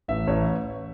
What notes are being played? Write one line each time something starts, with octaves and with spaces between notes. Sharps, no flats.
A1 E5
A1 C#5